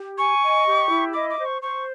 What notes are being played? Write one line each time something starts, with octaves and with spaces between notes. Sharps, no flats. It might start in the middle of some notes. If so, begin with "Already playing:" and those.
Already playing: G4
G#5 C#6
D#5
G4
E4
D#5 D6
D6
C5
C#6
C5 C#6